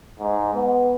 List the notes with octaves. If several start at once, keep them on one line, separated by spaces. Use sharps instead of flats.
G#2
B3